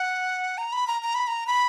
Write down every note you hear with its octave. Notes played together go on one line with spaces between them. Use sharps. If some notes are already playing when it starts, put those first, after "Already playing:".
Already playing: F#5
A#5
B5
A#5
A#5
B5
A#5
B5